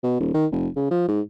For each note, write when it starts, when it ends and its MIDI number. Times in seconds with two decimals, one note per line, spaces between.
0.03 0.17 47
0.19 0.30 27
0.34 0.46 51
0.52 0.68 29
0.76 0.87 49
0.91 1.08 53
1.08 1.20 44